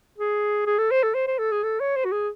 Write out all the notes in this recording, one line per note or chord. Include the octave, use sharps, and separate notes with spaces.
G#4
G#4
A4
C5
A4
C5
C5
A4
G#4
A4
C#5
C5
F#4
G#4